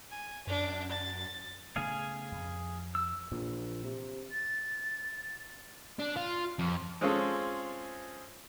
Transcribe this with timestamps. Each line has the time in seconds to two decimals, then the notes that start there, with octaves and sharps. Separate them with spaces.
0.11 G#5
0.47 F#2 D4
0.91 A6
1.76 C#3 A3 B3 G#4 F5 G#5
2.32 F2
2.95 E6
3.32 A#1 A#2 E3 F3
3.84 C3
4.32 A6
5.99 D4
6.16 F4
6.59 F2
7.01 G#3 C4 C#4 F4 G#4 A4